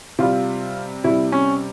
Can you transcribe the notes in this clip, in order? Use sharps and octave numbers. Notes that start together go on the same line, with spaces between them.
C3 G3 F4
C3 G3 E4
C#4